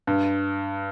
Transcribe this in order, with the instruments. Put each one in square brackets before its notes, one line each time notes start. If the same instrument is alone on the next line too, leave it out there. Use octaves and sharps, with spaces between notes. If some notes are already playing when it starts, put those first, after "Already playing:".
[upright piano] G2